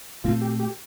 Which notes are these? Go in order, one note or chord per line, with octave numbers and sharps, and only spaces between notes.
A#2 A3 C4 F4
G4
G4